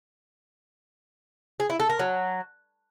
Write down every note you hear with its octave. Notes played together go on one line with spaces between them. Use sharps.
G#4
E4
A4
A#4
F#3